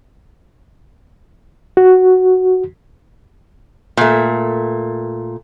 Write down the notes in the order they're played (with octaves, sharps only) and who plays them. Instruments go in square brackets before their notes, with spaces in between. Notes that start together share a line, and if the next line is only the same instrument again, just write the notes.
[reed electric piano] F#4
[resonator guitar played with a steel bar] A#2 A3